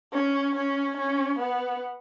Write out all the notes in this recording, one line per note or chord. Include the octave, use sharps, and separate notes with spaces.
C#4
C#4
C#4
B3